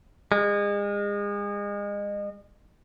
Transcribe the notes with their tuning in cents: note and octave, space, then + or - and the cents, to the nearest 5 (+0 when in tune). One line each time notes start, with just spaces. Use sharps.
G#3 -35